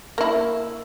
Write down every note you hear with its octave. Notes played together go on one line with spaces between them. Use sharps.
A#3 E4